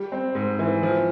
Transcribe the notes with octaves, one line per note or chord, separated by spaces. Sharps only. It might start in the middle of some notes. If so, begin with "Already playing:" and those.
Already playing: G3
C4
G#2
E3
F3